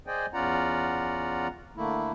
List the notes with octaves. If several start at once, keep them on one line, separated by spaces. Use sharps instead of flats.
G#4 C5 D5 D#5 G5 G#5
E2 C#4 F4 D5 F#5 A#5
D3 A3 A#3 E4